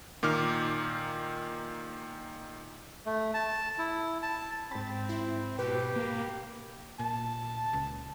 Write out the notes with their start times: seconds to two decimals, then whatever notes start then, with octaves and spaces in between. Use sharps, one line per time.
0.23 A#2 D#3 D6 F6
3.06 A3
3.34 A5
3.79 E4
4.23 A5
4.71 G#2 C4 B5 A6
5.09 E4
5.59 B2 G4 B4
5.96 A#3
6.99 A#2 A5
7.73 C#2